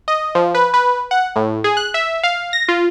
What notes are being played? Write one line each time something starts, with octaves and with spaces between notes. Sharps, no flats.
D#5
F3
B4
B4
F#5
A2
G#4
F#6
E5
F5
A#6
F4